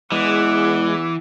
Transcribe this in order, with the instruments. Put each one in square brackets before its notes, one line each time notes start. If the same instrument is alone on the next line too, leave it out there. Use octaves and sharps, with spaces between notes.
[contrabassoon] E2 [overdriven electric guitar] E3 [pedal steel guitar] G#3 [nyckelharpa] F#5 D6